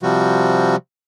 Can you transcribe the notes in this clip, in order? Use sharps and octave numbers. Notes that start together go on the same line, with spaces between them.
C3 F3 G3 F#4